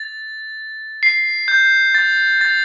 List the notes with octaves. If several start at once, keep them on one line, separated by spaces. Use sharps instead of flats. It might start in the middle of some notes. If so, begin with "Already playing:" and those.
Already playing: A6
C7
G6
A6
A6